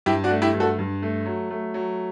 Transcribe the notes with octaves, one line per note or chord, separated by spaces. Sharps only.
G2 E4 G4
D4 F#4
A3
E4 G4
G2
F#4 A4
G2
A3
F#3
A3
F#3